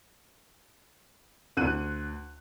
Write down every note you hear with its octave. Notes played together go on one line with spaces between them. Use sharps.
D2 F#6 D#7